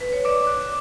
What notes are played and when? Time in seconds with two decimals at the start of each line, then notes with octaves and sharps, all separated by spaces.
0.01 B4
0.13 C#5
0.25 D5 D6
0.47 F#6